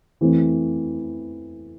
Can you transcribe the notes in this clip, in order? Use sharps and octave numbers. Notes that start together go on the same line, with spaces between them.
E3 A3 C4